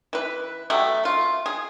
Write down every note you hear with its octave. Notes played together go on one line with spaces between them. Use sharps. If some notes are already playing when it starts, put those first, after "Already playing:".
E3 B4
F#3 G3 A3
F4
G#4